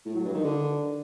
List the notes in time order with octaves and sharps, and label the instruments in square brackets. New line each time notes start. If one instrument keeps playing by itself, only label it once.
[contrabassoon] A2
F#3
G2
D#3
D3